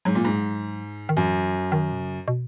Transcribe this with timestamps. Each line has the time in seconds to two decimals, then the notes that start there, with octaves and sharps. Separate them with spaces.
0.05 G#2 F#3
0.15 A#2
0.25 G#2
1.09 D#3
1.17 F#2 E3
1.72 D#3
1.92 B2
2.00 C#3
2.28 B2